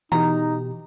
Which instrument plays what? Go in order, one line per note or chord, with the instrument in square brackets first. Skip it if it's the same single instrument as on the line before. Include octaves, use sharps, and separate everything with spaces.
[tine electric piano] B2 G4 [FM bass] E3 [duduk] D#4 [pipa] A#5